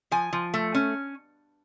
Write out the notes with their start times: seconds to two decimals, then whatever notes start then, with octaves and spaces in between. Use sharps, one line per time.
0.11 F3 G#5
0.33 F3
0.54 A3
0.75 C#4